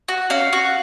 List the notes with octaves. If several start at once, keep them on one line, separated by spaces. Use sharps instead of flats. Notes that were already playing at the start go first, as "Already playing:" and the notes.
F#4
C#4 F5
F#4